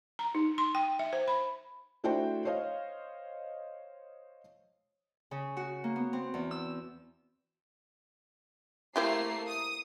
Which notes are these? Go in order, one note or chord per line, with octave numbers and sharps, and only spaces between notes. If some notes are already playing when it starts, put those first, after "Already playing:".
A#5
D#4
C6
G5
E5
C5
B5
A3 D4 E4 F#4 C5 G5
C5 C#5 D#5 F5
C#3
F#4
A#3
B3
C4
E2
E6
A3 A#3 C4 E4 G4 C7
D#6